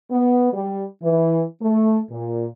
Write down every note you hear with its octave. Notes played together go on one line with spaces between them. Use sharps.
B3
G3
E3
A3
A#2